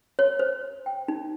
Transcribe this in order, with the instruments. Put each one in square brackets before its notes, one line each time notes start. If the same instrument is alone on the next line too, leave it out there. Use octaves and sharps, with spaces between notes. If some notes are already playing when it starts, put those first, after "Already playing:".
[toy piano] C#5
C5
G5
D#4